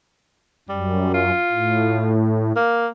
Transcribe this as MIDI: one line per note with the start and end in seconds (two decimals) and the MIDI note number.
0.69 1.31 42
0.69 1.12 55
1.14 2.11 65
1.52 2.52 45
2.56 2.87 58